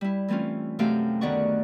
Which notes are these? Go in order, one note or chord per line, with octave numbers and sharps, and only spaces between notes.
G3 E4
E3 A3 C4 C#4 F4
F#2 C3 A3 F5 G5
D2 D#3 B3 D5 F#5 C#6